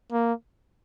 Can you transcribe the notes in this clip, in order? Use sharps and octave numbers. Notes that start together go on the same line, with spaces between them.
A#3